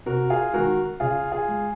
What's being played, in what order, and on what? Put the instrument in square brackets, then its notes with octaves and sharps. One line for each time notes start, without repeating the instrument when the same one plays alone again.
[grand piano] C3 F#4 A#4
F4 G#4
D#3 G#3 F#4 A#4
C#3 F4 G#4
F4 G#4
G#3